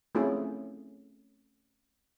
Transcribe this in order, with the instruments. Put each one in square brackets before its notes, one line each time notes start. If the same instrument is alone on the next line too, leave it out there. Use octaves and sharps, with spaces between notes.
[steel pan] A3 C4 C#4 E4 F4 G#4